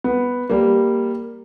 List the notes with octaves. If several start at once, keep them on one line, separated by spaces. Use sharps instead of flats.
B3
G3 A#3